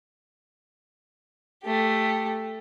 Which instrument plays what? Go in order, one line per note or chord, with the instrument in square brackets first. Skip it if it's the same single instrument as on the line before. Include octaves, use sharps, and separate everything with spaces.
[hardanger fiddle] A3 G4